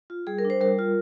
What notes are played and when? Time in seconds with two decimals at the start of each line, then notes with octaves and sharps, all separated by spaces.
0.10 F4
0.27 G3 G#4
0.39 A#4
0.45 D4
0.50 C5
0.61 G3 A#4
0.79 F4